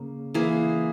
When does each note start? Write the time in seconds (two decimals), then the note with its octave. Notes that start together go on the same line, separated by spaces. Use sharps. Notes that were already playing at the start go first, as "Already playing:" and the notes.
Already playing: C#3 A#3
0.34 E3 A#3 G#4